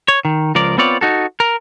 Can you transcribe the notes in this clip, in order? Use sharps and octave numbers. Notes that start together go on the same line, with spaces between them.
C#5
D#3
C#2 F3 A#4 D5
B3 C4 F4 C#5 D5
D#4 F#4 A4
A#4